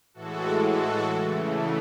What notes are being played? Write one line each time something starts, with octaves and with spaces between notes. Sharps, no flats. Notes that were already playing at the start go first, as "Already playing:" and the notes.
A2 E3 G#3 F#4 A4
F#4 A4
C#3 E3 A3